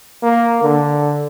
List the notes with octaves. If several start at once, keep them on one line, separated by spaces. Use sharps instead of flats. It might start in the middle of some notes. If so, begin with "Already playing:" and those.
A#3
D3